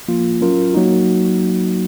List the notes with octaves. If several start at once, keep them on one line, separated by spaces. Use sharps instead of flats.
F3 A#3 F4
F#3 C#4 F4 A#4
F#3 A#3 D#4 F#4